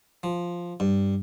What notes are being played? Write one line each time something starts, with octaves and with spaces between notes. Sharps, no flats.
F3
G2